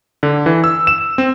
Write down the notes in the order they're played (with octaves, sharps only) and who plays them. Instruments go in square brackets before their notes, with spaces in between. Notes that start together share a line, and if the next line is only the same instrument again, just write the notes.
[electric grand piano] D3
E3
E6
E7
C4